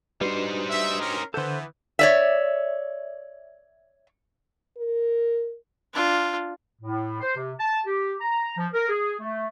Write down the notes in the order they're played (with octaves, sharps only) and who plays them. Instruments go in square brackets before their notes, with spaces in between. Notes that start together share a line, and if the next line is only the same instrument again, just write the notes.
[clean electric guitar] G3 [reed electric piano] D4 F#4 B4 [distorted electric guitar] D#4 C5
[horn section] E5
C#4 G4 A#4
[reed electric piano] D3 G6 [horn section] E3 B3 [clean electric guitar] A4 C5
[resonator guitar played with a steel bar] C#5 D5 E5
[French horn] A#4
[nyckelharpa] D4 F4
[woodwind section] A2
C5
C3
A5
G4
A#5
F3
A#4
G#4
A3